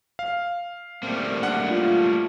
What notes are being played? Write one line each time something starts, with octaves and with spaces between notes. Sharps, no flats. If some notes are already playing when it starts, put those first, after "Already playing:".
F5
G3 A3 A#3 C4
D4 F#5
F4